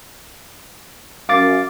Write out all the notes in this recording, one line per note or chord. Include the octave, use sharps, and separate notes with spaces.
F#2 F5 D6 A6